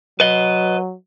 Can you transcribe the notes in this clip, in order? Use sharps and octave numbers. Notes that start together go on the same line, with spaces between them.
F#3 B4 D#5